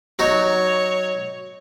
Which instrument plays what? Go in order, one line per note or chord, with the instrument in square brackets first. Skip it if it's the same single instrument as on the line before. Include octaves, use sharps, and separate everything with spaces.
[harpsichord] F#3 D#4 [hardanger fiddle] C#5